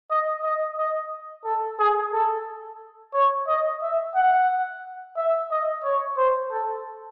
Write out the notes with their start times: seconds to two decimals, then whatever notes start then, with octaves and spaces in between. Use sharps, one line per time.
0.10 D#5
0.44 D#5
0.77 D#5
1.45 A4
1.79 G#4
2.13 A4
3.13 C#5
3.47 D#5
3.82 E5
4.15 F#5
5.16 E5
5.51 D#5
5.83 C#5
6.17 C5
6.51 A4